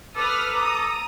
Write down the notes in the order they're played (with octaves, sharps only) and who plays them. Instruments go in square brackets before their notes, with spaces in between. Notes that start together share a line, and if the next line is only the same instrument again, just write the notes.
[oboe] A4 [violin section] B4 D#6 F6 [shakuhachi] D6
[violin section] A#5 D#6